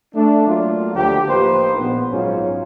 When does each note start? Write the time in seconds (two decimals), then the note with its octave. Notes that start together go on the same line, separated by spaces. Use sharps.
0.15 A3 D4
0.47 F#3 A3 A#3 D4 F4
0.95 D2 F3 A#3 G4
1.29 A1 F3 A#3 D#4 B4 C5
1.78 A#1 B3
2.12 G#2 F#3 C#4 F4